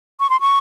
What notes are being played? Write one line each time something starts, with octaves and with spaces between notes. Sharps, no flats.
C#6
C6
C#6